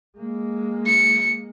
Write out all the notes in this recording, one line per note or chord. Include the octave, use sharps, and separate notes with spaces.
G#3 A#3
C#7